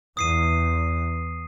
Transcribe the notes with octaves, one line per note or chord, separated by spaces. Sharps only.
E2 D#6 C7 D#7